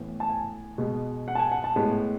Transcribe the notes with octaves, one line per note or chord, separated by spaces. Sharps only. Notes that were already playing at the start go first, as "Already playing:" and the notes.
Already playing: A2 E3 B3
A5
G#5
B2 G#3 B3
F#5
A5
G#5
F#5
A5
A2 G#3 B3